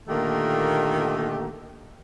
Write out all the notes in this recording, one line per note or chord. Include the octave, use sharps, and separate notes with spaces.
A#2 D3 D#3 A3 A#3 G4